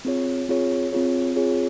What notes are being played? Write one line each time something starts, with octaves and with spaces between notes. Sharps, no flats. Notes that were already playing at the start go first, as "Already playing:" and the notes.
C4 F4 G#4 C#5
C4 F4 G#4 C#5
C4 F4 G#4 C#5
C4 F4 G#4 C#5